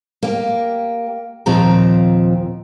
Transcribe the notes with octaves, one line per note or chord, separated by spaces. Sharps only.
A#3 G4
D#2 A#2 F3 C4 A#5